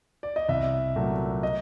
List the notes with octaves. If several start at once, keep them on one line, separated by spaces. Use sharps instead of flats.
D5
D#5
C2 E5
A#2 F#3 A3
D#5